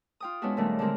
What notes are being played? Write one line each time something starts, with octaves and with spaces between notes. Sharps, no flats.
F4 G5 D#6
G#3 B3 C#4 D4 E4 F#4
D#2 A#2 D#3 G3 A3
D3 G#3 C4 A#4